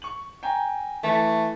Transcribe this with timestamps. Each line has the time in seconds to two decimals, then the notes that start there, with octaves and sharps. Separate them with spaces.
0.02 C#6 F#7
0.43 G5 G#5 A#5
1.03 E3 A3